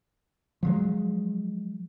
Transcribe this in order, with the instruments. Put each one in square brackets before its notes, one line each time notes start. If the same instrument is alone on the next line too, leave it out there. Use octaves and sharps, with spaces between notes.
[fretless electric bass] F3 F#3 G#3